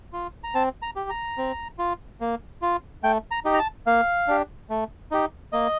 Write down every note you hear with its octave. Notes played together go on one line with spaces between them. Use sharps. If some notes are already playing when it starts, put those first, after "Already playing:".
F4
A#5
C4 A5
A#5
G4
A#5
C4
F4
A#3
F4
A3 G5
A#5
D#4 G4
A#5
A5
A#3 F5
D4 G4
A3
D#4 G4
A#3 D#5